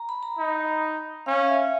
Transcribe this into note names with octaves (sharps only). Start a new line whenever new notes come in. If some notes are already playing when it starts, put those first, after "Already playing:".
Already playing: A#5
B5
A#5
D#4
C#4 F5
E5